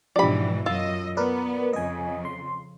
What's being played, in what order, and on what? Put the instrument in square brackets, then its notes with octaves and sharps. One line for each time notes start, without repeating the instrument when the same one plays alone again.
[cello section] G#2 B2 E3 [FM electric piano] F3 D4 G4 [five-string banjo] D5 B5
[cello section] F#2 D#5 [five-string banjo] F4 [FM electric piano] E6
[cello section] B3 [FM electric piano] A#4 B4 D5
[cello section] F2 C#3 [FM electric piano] D#5 G#5
[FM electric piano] C6